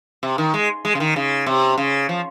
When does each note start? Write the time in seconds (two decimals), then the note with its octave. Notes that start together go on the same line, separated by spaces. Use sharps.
0.23 C3
0.38 D#3
0.54 G#3
0.85 G#3
0.95 C#3
1.00 D#3
1.16 C#3
1.46 C3
1.78 C#3
2.09 F3